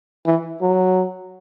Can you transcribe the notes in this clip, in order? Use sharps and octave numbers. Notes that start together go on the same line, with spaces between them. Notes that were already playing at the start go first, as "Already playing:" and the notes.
E3
F#3